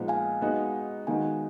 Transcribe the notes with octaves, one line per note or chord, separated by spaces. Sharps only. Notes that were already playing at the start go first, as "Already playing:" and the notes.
Already playing: A#2 F3 G#3 B3 D#4
F5 G#5
G#3 B3 D#4 F#4
D#3 G#3 B3 D#4 F#4 F5 G#5